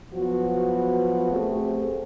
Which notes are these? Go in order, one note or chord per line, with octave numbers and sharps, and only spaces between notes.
F3 F#3 B3 F#4
A3 C4 G4 G#4